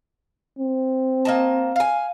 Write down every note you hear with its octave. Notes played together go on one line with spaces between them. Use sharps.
C4
A#3 D#5 A5
F5 G#5